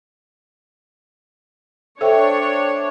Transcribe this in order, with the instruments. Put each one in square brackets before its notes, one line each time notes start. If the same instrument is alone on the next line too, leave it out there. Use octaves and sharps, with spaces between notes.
[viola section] D4 C#5 [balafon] A4 [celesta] C5 E5 G5